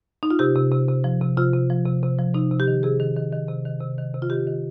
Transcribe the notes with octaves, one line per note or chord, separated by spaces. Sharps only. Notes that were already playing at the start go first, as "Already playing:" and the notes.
D#4
F4
C3 G4
C3
C3
C3
F3
C3
C3 F4
C3
F3
C3
C3
F3
C3 D#4
C3
G4
D#3
C3 G#4
D#3
D#3
D#3
C3
D#3
C3
D#3
C3
F4
D#3 G4
D#3